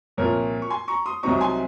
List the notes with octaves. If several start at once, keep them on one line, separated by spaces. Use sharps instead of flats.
C2 A#2 F3 A#4 C#5
C#6
G#5 C6
A#5 C#6
C6 D#6
C2 C3 F#3 C4 D#4 A#5 C#6
A#5
G#5 C6